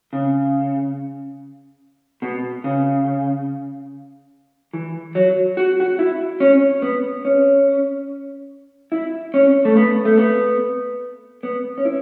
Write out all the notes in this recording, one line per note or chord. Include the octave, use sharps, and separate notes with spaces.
C#3
B2
C#3
E3
F#3
F#4
F#4
E4
C#4
B3
C#4
E4
C#4
A3
B3
A3
B3
B3
C#4
E4